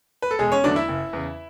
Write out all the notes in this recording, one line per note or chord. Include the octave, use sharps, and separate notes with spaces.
B4
A4
E1 G#3 G#4
C#4 C#5
E2 D3 F#3 A3 D4 D5
E4 E5
F#1
E2 C#3